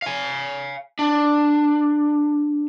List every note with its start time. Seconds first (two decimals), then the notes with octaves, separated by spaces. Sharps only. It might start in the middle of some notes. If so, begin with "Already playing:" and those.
0.02 F5 G#5
0.99 D4